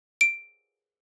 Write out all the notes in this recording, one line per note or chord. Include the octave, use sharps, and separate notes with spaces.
D7